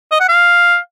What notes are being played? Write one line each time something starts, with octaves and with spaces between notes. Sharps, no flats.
D#5
F#5
F5